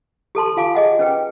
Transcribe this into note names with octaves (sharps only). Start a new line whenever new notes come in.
G4 A4 A5 C6
F4 F5 G#5 D6
G#4 D#5 F#5
C#4 B4 G5